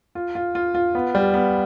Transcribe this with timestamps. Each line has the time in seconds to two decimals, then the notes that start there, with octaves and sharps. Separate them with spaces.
0.15 F4
0.35 F4
0.55 F4
0.75 F4
0.95 B3
1.15 G3
1.34 B3